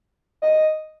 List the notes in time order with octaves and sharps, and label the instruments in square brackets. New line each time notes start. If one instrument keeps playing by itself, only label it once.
[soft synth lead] D#5